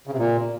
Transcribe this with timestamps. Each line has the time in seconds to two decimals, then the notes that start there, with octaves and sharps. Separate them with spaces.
0.07 C#3
0.13 C3
0.18 A#2